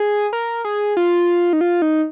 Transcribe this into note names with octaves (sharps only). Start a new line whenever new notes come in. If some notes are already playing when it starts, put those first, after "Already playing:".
Already playing: G#4
A#4
G#4
F4
D#4
F4
D#4